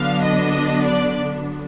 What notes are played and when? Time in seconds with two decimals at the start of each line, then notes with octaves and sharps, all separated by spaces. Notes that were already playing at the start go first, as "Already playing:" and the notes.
Already playing: D3 F#3 B3 D4 F5
0.24 D#5
0.85 D5